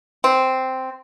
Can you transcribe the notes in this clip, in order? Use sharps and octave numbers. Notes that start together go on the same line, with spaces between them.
C4